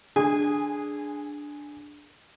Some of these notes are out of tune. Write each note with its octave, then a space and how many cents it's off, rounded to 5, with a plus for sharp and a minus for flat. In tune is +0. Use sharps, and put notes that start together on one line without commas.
D3 +0 G#4 +0 G#5 -25